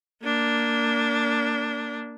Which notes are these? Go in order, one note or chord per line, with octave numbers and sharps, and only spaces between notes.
A#3 D4